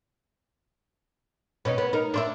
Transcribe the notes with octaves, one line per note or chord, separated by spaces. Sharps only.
B2 C#4 D#4
B3
D#4 A#4
D4 C5 E5